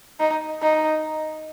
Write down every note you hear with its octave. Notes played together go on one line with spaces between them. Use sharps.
D#4
D#4